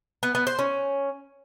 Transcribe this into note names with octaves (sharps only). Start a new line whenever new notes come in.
B3
B3
C5
C#4